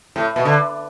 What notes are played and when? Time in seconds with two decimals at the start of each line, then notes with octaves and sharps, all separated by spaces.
0.16 A2
0.36 B2
0.45 D3